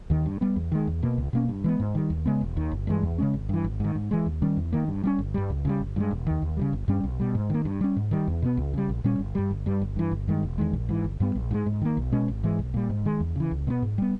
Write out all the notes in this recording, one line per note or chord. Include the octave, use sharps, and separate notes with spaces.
D#2 D#3
G2
G3 B3
E2
D#3 G#3
E2
B2 A#3
C#2
B2 A#3 C#4
G2
E3 G#3 B3
G#2
D#3 G3
D#2
C#3 G#3 B3
E1
D#2 D#3
G1
G2 E3 G#3
E2
C#3 G#3 C#4
G#1
G2 E3
G#1
G#2 D#3
G#2
E3 G#3
D#2
D#3 G3 C#4
E2
D#3 A#3
G2
G3 A#3 C#4
G1
G2 G3
C#2
C#3 E3 G3
G1
G2 E3 G#3
E1
D#2 D#3
D#2
C#3 E3 G3
G1
G2 G3 C#4
B1
B2 G3
G#2
D#3 A#3
G2
G3 C#4
G#2
D#3 G3
E2
B2 G#3 B3
C#2
C#3 G3
A#1
A#2 G3 C#4
G1
G2 G3
G1
G2 G3
G1
G2 E3
G1
G2 D#3 G#3
E1
E2 D#3 G#3
A#1
G#2 E3
G1
G2 G3 B3
A#1
G#2 D#3 G#3
G#2
D#3 A#3
B1
B2 G#3 C#4
G#1
G#2 E3 G#3
B1
A#2 G3
G#2
D#3 G#3
E2
C#3 E3
C#2
B2 G#3 B3
G#2
G3 B3